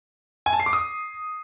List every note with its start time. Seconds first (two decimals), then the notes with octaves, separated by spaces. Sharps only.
0.46 G#5
0.53 A5
0.60 C7
0.66 D6
0.73 D#6